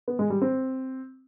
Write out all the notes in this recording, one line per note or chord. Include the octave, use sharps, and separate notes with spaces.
B3
G#3
G3
C4